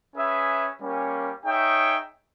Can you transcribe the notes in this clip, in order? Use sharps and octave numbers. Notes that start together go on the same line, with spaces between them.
C#4 G#4 B4 E5
G3 A#3 C#4
D#4 G#4 C#5 E5 G5